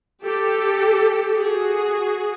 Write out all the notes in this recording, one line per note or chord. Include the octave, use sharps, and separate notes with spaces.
G4 A4
F#4 G#4